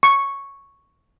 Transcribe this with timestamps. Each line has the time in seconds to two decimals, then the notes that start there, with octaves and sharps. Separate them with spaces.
0.03 C#6